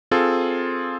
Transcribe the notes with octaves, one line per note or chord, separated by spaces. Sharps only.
C4 F4 G#4 A4